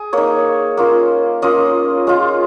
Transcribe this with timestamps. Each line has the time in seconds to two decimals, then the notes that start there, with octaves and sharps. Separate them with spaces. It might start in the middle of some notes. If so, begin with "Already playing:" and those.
Already playing: G#4
0.13 A#3 D#4 C#5
0.77 A#3 C#4 F4
1.42 A#3 C#4 F4 D#5
2.07 G#3 C#4 F4